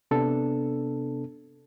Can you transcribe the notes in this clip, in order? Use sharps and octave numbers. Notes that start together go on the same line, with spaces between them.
C3 B3 D4 A4